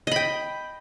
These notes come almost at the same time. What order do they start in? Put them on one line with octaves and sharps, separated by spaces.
D#5 B5 G5